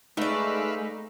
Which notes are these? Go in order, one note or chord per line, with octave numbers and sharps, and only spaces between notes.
G#3 A3 D#4 B4 D5 E5 F5